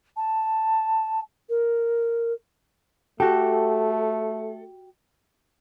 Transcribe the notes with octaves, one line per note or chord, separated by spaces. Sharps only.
A5
A#4
A3 F#4 G4 A4